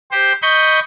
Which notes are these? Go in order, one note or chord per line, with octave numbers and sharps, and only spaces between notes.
G4 C5
D#5 B5 C#6 G6